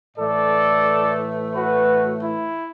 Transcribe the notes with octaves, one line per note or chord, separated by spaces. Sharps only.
A2 E3 A3 A4 D5
F#4 B4
E4